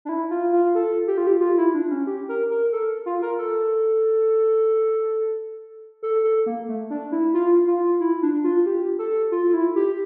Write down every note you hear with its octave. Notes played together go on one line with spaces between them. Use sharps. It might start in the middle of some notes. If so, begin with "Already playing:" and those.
D4
E4
F4
F4
A4
G4
F4
G4
F4
E4
D4
C#4
G4
A#4
A#4
A4
F4
A#4
A4
A4
A4
A#3
A3
D4
E4
F4
F4
E4
D4
F4
G4
A4
F4
F4
E4
G4